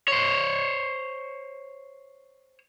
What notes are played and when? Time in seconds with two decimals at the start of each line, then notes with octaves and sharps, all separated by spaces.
0.08 C5 C#5